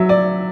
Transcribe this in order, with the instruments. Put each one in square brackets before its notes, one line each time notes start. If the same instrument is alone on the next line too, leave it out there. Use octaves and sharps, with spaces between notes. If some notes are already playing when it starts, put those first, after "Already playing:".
Already playing: [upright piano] F#3 E5
D5